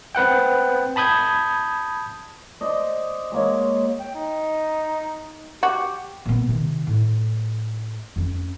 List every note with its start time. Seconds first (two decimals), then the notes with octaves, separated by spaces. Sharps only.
0.15 C4 B4 F#5 G5
0.96 A5 B5 D#6 G6 G#6
2.61 C5 D5 D#5
3.32 G#3 A#3 C#5
4.00 G5
4.15 D#4
5.63 F#4 G4
6.26 A#2 B3
6.49 C3 D#3
6.87 A2
8.16 F2 C#4